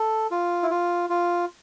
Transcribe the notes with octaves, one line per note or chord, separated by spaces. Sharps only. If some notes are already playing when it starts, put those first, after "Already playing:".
Already playing: A4
F4
E4
F4
F4